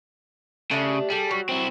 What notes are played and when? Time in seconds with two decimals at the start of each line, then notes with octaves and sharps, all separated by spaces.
0.71 C#3 A3 D4 G4
1.10 G3 G#4 A4
1.31 F#3
1.49 C4 E4